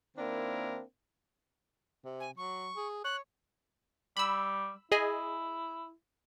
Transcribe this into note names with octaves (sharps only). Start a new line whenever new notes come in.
D#3 A#3 C4 D4 E4 A#4
C3
G#5
F#3 C#6
G#4
C#5 F#6
G3 B5 E6
E4 G#4 D#5 G#5